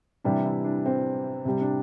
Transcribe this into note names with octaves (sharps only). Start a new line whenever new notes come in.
C3 E3 G3 D4
E4
D4
C4
C3 G3
D4